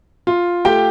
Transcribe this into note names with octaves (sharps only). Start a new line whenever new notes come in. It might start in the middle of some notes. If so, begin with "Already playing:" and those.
F4
A3 G4 G5